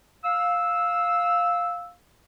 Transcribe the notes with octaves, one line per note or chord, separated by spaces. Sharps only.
F5 E6